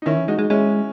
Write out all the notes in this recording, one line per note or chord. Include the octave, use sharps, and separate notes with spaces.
D#4
D#3 C#4 E4
E3
G#3 D#4 F#4
G#3
G#3 C#4 E4